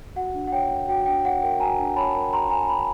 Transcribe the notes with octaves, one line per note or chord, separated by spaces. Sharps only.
F#4 F#5
D4
F#5
C#5 G5
A#4
F#4 G5
D4 G5
C#5 F#5
A#4 G5
F#4 G#5 A#5
D4
C#5 A5 B5
A#4
F#4 A#5 C6
D4 G#5 A#5
C#5 A5 B5